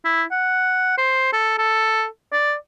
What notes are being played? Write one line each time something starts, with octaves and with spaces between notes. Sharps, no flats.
E4
F#5
C5
A4
A4
D5